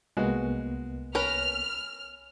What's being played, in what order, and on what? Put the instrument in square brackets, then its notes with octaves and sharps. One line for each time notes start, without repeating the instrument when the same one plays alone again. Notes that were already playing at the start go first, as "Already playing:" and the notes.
[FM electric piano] C2 A#3 B3 [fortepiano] G#3 F#4
[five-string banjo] C#4 A#4 B4 [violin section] F6